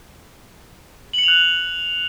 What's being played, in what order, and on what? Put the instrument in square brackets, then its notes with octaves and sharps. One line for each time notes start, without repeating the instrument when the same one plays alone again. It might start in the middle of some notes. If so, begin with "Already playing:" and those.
[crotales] F#7
C#7
F7
F#6